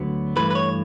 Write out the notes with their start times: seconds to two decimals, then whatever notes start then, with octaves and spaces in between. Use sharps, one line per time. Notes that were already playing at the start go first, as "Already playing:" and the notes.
Already playing: D2 D3 F#3 B3
0.36 G2 E3 A3 B4
0.51 B4
0.55 C#5